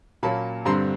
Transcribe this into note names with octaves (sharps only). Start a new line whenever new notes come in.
A#2 F#3 A#3 C#4 A5 B5
G2 D3 G3 C4 A#5 C6